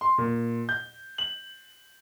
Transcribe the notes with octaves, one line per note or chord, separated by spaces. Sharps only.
C6
A#2
G6
F#7